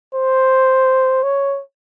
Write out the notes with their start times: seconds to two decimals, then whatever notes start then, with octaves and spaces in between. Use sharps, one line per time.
0.14 C5
1.23 C#5